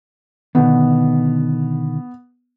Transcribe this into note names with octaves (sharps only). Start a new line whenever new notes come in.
B2 D3 D#3 B3